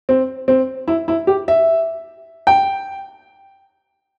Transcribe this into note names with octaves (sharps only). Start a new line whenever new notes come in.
C4
C4
E4
E4
G4
E5
G5